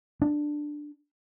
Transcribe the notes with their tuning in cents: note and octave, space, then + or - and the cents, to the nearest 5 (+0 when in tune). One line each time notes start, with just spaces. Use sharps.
D4 +10